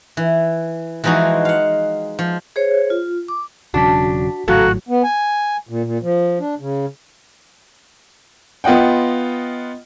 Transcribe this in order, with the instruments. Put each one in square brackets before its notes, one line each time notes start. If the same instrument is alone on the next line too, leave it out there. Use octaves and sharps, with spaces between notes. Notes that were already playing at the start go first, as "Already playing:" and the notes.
[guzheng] E3
E3 F3 G#3 D#4 F#4
F5 F#5
F3
[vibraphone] G#4 C5 C#5
F4
D6
[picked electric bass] E1 C#3 F#3 [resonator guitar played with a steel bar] D4 [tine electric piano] F#4 B6
[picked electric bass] G#1 A2 F#3 [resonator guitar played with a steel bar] C#3 [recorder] F#4 [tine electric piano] A4 A#5
[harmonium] B3
G#5
A#2
A#2
F3
D4
C#3
[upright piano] B3 F4 D#5 F#5 G5